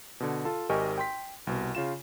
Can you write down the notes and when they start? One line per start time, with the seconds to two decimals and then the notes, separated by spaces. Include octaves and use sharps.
0.20 B2 D3
0.45 F4 A4 A5
0.69 G#1 G4 A#4 D#5 G#5 C#6
0.98 G5 C6 B6
1.47 C2 B2
1.75 C#3 F4 E7